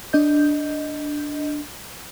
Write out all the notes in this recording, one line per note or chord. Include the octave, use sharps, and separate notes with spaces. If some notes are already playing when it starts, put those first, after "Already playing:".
D4 D#5 G6